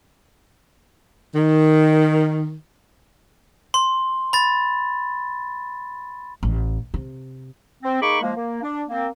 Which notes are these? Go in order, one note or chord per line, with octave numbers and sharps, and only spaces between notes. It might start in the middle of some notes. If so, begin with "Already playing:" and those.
D#3
C6
B5 A6
A1
C3
C4
A#3 D#4 G#4 B5 C#6 D6
F3 G#3 A#3
A#3
D4
A#3 C4